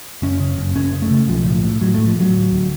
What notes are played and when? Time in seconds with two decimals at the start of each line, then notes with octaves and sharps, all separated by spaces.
0.22 F#1 C#4
0.40 C#3
0.58 F#1
0.75 F#1 C#4
0.93 C#3
1.02 A3
1.11 C#3
1.28 B1 F3
1.46 A2
1.64 A2
1.81 A2 F#3
1.94 A2 A3
2.07 F3
2.16 A2 F#3
2.34 D2
2.51 D2